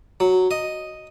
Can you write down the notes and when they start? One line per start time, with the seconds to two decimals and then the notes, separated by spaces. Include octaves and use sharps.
0.20 F#3
0.51 D#5